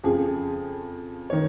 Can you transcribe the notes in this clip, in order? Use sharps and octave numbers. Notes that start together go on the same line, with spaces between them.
F2 C#3 F3 G#4
D#3 C#5